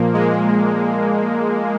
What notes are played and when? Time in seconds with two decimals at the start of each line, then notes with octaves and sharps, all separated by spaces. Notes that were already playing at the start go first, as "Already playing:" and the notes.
Already playing: A#2 F3 A#3
0.14 G#3